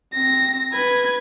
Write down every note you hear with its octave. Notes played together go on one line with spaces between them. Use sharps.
C4 A#6
B4 G#6